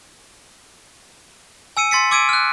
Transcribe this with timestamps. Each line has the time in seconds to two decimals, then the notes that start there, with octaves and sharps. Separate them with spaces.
1.77 G#5 E6 C#7 D#7
1.91 C6 A6 B6 C#7
2.11 D6 E6 G#6 D7 D#7
2.29 F6 F#6